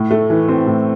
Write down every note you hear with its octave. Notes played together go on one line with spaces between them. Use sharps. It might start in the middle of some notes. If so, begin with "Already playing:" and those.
Already playing: A2
A3
E3
C4
A2